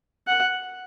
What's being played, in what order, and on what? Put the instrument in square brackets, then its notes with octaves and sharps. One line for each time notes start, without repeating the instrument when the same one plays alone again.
[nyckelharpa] F#5